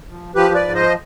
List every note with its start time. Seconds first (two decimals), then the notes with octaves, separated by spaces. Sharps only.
0.08 F3
0.35 F3 G4 B4
0.54 B4 D5
0.60 G#2
0.75 C5 D#5